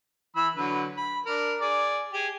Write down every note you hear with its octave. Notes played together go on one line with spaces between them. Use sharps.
E3 B5 E6
D3 F#3 B4
B5
D4 A#4
G#4 D5
G4 G#4